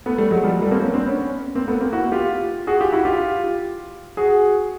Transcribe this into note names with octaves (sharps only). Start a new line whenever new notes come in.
A3 B3
G3 A3
F#3 G#3
F3 G3
G3 A3
A#3 C4
B3 C#4
C4 D4
B3 C#4
A#3 C4
A3 B3
A#3 C4
E4 F#4
F4 G4
F#4 G#4
F4 G4
E4 F#4
F4 G4
F#4 G#4